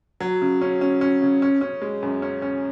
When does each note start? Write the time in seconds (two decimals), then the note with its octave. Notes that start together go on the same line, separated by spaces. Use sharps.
0.20 F#3
0.42 C#3
0.62 C#4
0.81 C#4
1.01 C#4
1.22 C#3
1.42 C#4
1.61 C#4
1.82 G#3
2.03 F#2
2.22 C#4
2.42 C#4